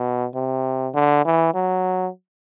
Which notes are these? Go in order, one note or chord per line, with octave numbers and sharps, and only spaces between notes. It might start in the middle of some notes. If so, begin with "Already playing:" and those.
Already playing: B2
C3
D3
E3
F#3